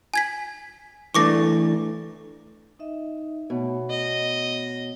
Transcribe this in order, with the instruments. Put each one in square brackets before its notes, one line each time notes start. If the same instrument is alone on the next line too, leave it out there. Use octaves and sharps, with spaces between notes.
[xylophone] G#5 G#6 B6
[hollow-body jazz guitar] E3 A3 D4 [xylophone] C#6 D6 A#6
[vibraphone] D#4 D#5 E5
[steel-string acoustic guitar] B2 [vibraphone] A3 B3 C#5
[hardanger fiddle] D#5